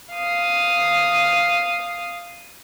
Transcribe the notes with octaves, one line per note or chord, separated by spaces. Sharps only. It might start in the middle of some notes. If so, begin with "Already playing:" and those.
F5 D#6